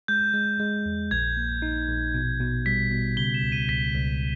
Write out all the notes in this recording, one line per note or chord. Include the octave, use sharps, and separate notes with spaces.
G#3 G6
G#3
G#3
E2
A#1 G#6
A#3
D#4
A#1
B2
B2
G3 B6
B2
C#3 G7
E7
C#2
D#7
C#2 B6
C#2